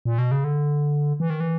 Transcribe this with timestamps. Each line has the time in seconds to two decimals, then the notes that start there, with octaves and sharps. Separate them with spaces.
0.05 A#2
0.18 B2
0.31 C#3
0.44 D3
1.20 E3
1.30 D#3
1.40 E3